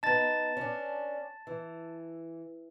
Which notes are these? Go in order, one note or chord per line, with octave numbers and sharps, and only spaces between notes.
B3 D#4 A5 A6
C#4 D4
E3